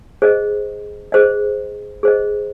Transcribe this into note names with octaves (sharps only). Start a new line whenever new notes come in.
G#4 C5 D#5
G#4 C5 D#5
G#4 C5 D#5